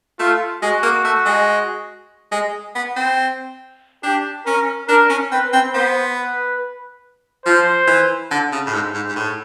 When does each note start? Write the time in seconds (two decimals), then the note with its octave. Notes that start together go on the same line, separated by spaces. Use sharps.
0.19 A3 F4
0.61 G#3 F#4
0.83 A#3
1.04 A3
1.25 G#3
2.32 G#3
2.76 B3
2.96 C4
4.03 D4 G4
4.45 C#4 A#4
4.89 D4 A#4
5.10 C#4
5.32 C4 B4
5.53 C4
5.74 B3 C5
6.17 B4
7.45 F3 C5
7.87 E3
8.31 D3
8.52 C#3
8.67 A2
8.73 G#2
8.94 G#2
9.08 G#2
9.16 A2